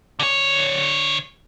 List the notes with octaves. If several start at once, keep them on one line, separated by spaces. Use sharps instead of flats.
D3 C#5